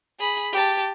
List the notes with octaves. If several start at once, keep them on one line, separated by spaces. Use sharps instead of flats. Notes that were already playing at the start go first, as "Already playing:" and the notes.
G#4 B5
G4 A5